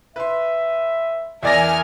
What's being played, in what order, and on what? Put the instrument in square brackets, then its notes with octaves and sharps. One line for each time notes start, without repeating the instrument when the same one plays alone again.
[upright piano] B4 C6 [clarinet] E5
[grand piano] E2 D5 A#6 [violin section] A#4 G#5 F6 [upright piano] E5